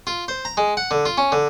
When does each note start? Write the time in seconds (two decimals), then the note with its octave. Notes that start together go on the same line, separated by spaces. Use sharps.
0.07 F4
0.28 C5
0.45 A#5
0.57 G#3
0.77 F#5
0.91 D3
1.06 F4
1.18 C#4
1.32 D3